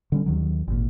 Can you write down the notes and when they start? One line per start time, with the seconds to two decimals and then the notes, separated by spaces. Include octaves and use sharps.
0.12 D3 G3 C#4
0.26 D#2 D#3 F#3
0.68 G#1 A#2